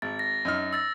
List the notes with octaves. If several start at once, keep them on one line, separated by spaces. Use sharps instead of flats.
G#1 A6
A#6
F#2 D#4 F6
E6 A6 A#6